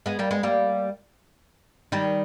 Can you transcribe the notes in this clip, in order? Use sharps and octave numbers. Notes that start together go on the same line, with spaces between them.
G#3 B3
G3 A#3
G#3 B3
G3 A#3
D#3 G3